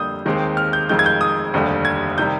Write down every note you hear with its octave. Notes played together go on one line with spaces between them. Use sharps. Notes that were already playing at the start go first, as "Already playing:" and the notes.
Already playing: F2 D3 G3 A#3 D#6 G6
D#2 D#3 G#3 C4
F6
G6
F1 F2 D#3 G#3 G6
G#6
G6
D#6
F1 D#2 D3 G3
G#6
C3 D#3 G3 G6